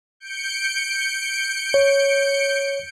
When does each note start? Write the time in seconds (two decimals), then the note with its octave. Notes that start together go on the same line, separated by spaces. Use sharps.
0.20 G6 C#7 D7
1.74 C#5